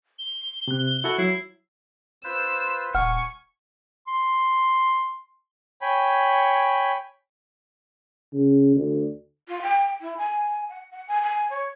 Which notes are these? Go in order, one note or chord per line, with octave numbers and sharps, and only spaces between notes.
G7
C3 F#6
E4 F#4 A4 E5
F#3 E4 C7
F4 B4 C5 E6
D#1 F#5 G#5 C#6 F6
C6
C#5 G5 G#5 B5
C#3
D2
F4
G5
E4
G#5
F#5
F#5
G#5
G#5
C#5